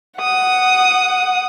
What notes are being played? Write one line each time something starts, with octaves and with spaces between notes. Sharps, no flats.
F#5 D#6